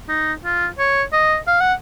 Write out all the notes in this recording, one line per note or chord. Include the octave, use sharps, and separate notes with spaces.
D#4
F4
C#5
D#5
F5
F#5